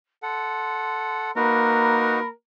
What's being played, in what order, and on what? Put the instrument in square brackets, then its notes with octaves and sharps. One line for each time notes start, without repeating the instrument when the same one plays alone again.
[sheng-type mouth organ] A4 F#5 [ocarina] C6
[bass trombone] A#3 [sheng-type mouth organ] D#4 F#4 B4 [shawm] A#4 [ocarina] B5